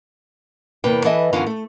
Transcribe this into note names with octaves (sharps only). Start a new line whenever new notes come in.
E2 C3 A#3 B4 G5
E3 A4 B4 D#5 E5
F#2 D3 E3 B3 C#4 F4
A3